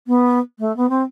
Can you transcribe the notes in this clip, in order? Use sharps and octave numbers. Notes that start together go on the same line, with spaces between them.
B3
A3
B3
C4